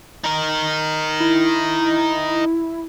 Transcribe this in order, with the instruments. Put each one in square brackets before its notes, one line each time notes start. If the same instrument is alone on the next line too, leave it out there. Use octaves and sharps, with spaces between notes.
[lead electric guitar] D#4 A#4
[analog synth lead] E4